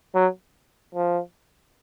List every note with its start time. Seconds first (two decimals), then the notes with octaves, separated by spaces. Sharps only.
0.15 F#3
0.95 F3